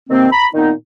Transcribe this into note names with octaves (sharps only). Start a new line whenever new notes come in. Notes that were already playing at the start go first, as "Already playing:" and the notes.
C3 D#3 A#3 C4
A#5 B5
A#2 D#3 B3 C4 D#4